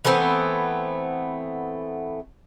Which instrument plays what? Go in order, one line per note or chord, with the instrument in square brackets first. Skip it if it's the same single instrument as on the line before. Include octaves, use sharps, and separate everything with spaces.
[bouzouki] E3 A3 B3 C4